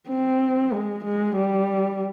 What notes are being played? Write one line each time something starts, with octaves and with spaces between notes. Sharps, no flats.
C4
G#3
G#3
G3